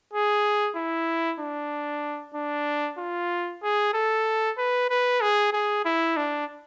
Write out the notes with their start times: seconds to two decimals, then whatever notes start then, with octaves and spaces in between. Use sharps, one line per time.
0.13 G#4
0.76 E4
1.40 D4
2.35 D4
2.98 F4
3.63 G#4
3.93 A4
4.58 B4
4.90 B4
5.21 G#4
5.53 G#4
5.85 E4
6.17 D4